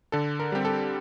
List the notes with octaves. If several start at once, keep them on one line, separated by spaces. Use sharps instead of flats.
D3 A4
A#4
G3 C4 G4
A4